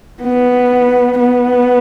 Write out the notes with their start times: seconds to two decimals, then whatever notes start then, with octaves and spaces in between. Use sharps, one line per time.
0.22 B3
1.18 B3